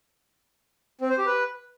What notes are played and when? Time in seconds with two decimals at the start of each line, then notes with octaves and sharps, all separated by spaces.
1.01 C4
1.10 C5
1.18 G4
1.26 B4